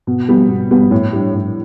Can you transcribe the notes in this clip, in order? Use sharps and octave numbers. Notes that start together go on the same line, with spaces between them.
B2
G3 B3
B2
G3 B3
A2
G3 D4
A2